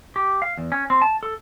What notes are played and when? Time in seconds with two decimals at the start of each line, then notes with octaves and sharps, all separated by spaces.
0.16 G4
0.42 F5
0.57 E2
0.72 C#4
0.90 C4
1.02 A5
1.23 A4